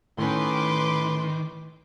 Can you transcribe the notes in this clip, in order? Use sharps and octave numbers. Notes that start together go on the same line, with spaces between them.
A2 D#3 C#4 B4 C6 D6